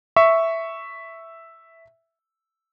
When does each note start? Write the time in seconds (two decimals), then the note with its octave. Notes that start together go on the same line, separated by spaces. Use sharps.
0.16 E5 C#6